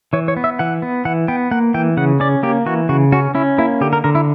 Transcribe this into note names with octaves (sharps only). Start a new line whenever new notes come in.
E3 C#5
C#5
B3
E5
E3 F#5
B3
E3 F#5
B3 G5
A#3 F#5
E3 G5
C#3 F#5
C#4 D5
A#3 G4
E3 F#4
C#3 F#4
C#4 F#4
C#4 E4
A#3 E4
D3 G4
A#4
D3 A#4
E4